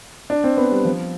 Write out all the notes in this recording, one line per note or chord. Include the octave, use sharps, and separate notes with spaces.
D4
C4
B3
G3
F3